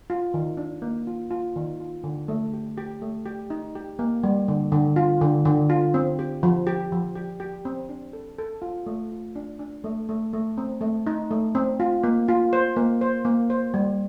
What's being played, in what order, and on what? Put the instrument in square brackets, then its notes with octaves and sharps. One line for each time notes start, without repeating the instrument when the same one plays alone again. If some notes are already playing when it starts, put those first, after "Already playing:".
[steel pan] F4
D#3
D4
A#3
F4
F4
D#3
F4
D3
A3
G4
G4
A3
G4
D#4
G4
A#3
G3
D3
D3
F4
D3
D3
F4
C4
G4
F3
G4
F3
G4
G4
C4
D4
A4
A4
F4
A3
F4
D4
D4
A3
A3
A3
C4
A3
D#4
A3
C4
F4
A#3
F4
C5
A#3
C5
A#3
C5
G3